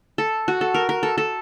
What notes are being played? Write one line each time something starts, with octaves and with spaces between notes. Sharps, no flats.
A4
F#4
A4
A#4
A#4
A4
A4